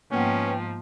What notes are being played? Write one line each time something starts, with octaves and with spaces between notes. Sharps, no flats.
G#2 F3 A#3 B3 C#4 B4 F#5 G5